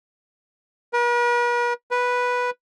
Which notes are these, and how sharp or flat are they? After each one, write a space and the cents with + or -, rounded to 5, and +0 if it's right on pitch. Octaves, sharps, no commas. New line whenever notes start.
B4 -45
B4 -5